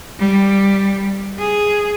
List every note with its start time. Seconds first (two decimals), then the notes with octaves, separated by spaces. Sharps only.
0.19 G3
1.39 G#4